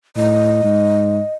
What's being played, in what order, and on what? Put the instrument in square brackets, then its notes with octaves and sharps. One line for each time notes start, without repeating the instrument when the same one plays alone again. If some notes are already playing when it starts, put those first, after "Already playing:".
[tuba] A2 [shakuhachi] D#5
[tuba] G#2